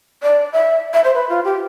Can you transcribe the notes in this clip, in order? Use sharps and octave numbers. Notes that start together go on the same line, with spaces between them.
D5
E5
E5
C5
B4
F4
G4